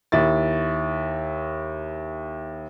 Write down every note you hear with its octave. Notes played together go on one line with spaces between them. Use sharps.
D#2 E4 A6